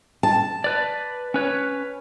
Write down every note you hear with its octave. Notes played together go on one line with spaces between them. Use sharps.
A5
B4 D5
C#4 B4 C#5